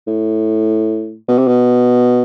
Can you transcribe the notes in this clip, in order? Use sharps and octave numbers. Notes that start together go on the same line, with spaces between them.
A2
B2
C3
B2